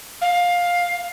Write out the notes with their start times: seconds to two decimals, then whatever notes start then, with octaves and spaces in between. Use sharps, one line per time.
0.21 F5